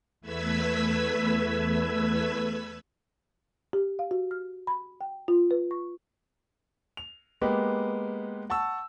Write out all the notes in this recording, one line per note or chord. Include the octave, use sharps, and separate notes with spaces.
E2 A3 B4 E6 G#6 B6
G4
F5
F#4
F6
B5
G5
F4
B4
C#6
F7
G#3 A#3 B3 G4 B4
F#5 A5 C#6 E6